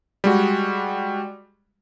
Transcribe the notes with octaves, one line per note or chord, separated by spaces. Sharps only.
G3 G#3 F#4